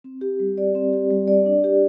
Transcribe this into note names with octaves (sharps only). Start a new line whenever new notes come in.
C4
G4
G3
D5
C4
G4
G3
D5
D4
G4